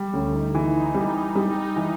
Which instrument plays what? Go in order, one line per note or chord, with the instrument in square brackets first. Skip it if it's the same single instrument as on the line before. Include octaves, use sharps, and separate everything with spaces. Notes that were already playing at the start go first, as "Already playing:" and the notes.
Already playing: [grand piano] G3
[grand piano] D2 [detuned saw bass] C#4
[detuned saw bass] D#4
[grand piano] E3 [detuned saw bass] D#4
[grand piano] G3
G3
E3